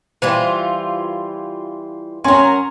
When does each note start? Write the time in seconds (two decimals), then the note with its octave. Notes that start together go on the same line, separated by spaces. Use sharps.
0.22 E3 G3 F4 C5
2.24 F#3 C#4 A#4 G#5 C6